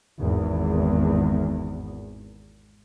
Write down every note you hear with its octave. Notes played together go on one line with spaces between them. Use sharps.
G#1 E2